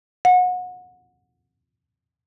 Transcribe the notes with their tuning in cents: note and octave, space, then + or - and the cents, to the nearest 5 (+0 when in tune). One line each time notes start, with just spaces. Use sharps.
F#5 -30